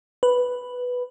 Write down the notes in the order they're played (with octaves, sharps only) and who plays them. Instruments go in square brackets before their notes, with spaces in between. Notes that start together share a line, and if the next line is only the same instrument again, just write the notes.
[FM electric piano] B4